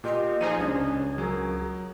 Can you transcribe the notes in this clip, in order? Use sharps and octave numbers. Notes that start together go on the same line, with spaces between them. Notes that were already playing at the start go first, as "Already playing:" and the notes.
A#2 F4 G4 D#5
F3 D#4 G#4 D#7
C#2 C#4 D4 G#4 C5
F#3 A#4